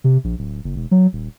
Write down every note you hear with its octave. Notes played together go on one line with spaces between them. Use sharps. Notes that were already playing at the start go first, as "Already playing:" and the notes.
C3
A#1
D1
F#1
E1
F#3
D#1